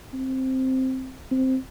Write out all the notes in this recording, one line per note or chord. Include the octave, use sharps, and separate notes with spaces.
C4
C4